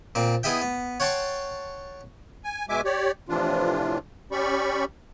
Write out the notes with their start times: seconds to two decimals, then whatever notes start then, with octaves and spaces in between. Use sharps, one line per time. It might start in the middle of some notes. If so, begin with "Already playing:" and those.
0.15 A#2 C4
0.43 B3 E4 G#4 D#5 E5 G5
0.62 B3
1.00 C#5 F#5 G5 A5 C6 C#6
2.44 G#5
2.69 B2 G#3 E5 G#5 D6
2.85 G4 C#5 D5
3.29 A2 C3 E3 F3 D4 F4
4.32 C#4 G4 D5 B5 C#6